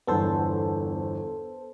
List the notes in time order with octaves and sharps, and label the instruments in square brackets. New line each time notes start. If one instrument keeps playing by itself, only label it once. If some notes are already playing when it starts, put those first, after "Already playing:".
[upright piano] G1 E2 [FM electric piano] B3 A4 C5